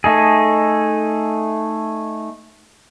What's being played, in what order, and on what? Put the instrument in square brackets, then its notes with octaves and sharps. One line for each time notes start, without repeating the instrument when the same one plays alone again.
[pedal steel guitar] A3 D#4 G#4